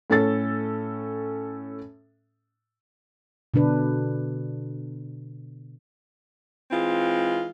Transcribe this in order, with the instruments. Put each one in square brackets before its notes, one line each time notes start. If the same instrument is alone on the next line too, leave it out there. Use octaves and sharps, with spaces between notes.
[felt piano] A2 C#4 A4 A6
[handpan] B2 D3 D4 B4
[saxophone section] E3 G#3 C4 F4